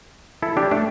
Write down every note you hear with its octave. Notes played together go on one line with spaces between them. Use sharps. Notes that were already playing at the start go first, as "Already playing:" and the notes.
E4 A4
D4 G4
A3 D4